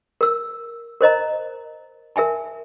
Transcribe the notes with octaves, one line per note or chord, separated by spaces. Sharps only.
A#4 E6
A#4 C5 D#5 A#5
A#4 E5 G#5 A5